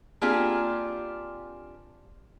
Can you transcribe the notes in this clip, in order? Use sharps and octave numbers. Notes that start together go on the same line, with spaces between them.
A#3 C4 D4 F4 G4 G#4